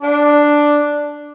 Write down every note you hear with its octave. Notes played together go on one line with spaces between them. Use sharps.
D4